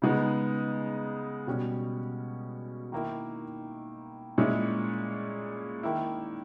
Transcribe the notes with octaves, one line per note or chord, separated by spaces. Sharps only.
C#3 G#3 B3 D#4
B2 G3 C#4
D#3 A#3 E4
A#2 G#3 C#4 E4
D#3 A#3 E4